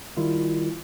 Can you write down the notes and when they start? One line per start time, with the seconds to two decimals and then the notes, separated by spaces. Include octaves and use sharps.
0.17 D#3 G3 E4 F4